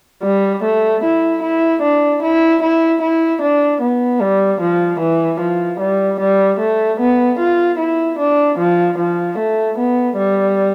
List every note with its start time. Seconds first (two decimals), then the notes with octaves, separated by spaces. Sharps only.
0.23 G3
0.63 A3
1.03 E4
1.42 E4
1.82 D4
2.22 E4
2.62 E4
3.01 E4
3.42 D4
3.81 B3
4.20 G3
4.60 F3
5.00 E3
5.40 F3
5.80 G3
6.20 G3
6.59 A3
6.99 B3
7.39 F4
7.78 E4
8.18 D4
8.58 F3
8.98 F3
9.38 A3
9.78 B3
10.17 G3